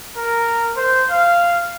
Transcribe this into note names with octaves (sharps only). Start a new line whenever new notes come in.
A#4
C5
F5